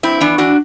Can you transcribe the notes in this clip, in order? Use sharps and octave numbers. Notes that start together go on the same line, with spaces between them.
G2 C4 E4
E3 B3 D4
E3 D4 F#4